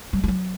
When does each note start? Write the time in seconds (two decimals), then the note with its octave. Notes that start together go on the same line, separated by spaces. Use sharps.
0.13 G3
0.23 G3
0.28 F#3